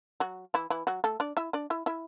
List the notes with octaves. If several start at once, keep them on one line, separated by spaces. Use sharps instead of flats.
F#3 F#4
E3 E4
E3 E4
F#3 F#4
A3 A4
D4 D5
E4 E5
D4 D5
E4 E5
E4 E5